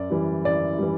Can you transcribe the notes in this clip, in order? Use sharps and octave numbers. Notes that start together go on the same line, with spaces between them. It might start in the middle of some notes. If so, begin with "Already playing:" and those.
Already playing: F#2 D5
E3 G3
F#2 D5
E3 G3